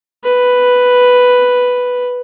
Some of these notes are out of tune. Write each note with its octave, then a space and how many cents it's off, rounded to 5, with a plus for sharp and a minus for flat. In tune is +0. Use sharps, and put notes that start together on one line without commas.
B4 +0